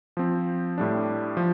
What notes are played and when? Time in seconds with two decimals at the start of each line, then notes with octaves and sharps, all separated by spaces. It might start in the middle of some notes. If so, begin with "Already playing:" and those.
0.17 F3 C4
0.78 A2 G3 D4
1.37 F3